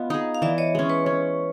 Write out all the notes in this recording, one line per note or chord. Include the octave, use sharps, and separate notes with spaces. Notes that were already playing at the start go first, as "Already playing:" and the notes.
Already playing: B3 F4 D#5 F5
D#4 G#4
F5
E3 D5 E5
C#5 D#5
G#3 C#4
B4 C#5
C#4